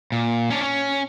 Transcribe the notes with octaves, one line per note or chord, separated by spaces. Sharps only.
A#2
C#4 D4
C#4